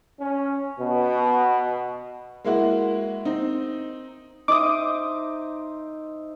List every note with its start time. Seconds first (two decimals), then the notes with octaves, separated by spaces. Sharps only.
0.20 C#4
0.79 B2
2.45 G#3 A#3 E4 F#4
3.25 C4 D#4
4.48 D#4 C5 E5 D6 D#6